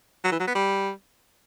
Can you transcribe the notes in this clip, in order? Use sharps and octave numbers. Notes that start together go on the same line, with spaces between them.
F#3
E3
F#3
B3
G3